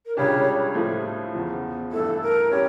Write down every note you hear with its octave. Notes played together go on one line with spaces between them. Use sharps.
A#4
C#2 C#3 G3 D4 G4 C#5
A2 F3 A3
E2 C#3 F3
G2 E3 A3 E4 A4
A#4
G3 C#4 G4 C#5